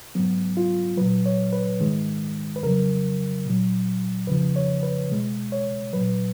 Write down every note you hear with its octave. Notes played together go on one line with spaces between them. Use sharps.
G#2 F#3 B3
F4
A#2 F#3 B4
C#5
B4
G#2 D#3 G#3
B4
F2 C#3 F#3 A#4
A#2 F#3
F2 C#3 F3 B4
C#5
B4
B2 G#3
C#5
A#2 F#3 B4